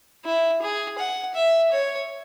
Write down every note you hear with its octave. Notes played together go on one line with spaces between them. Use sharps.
E4
G#4
F#5
E5
C#5